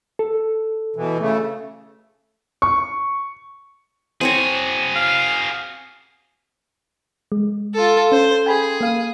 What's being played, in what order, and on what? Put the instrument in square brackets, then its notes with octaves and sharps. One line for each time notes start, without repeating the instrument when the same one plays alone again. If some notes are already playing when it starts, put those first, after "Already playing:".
[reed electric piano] A4
[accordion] B2 E3
C#3 A3
[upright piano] C#6
[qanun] C4 C5 C#5 [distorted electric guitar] F#4 G#4
[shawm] F5
[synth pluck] G#3
[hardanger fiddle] F4 A4
[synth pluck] C#4 [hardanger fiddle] C5
[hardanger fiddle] G#4 [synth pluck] G5 G#5 B5
[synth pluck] A#3 F5 D#7